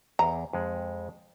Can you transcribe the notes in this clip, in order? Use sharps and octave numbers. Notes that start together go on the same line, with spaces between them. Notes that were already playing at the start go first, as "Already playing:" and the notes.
E2 A#5
F2 G#3